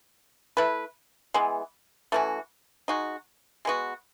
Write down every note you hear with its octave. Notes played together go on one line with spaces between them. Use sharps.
A3 E4 B4
E3 G#3 B3
E3 A3 C#4 F#4
G#3 D#4 F#4
G#3 B3 F#4